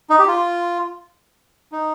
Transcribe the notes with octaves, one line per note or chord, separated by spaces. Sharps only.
D#4
G4
F4
D#4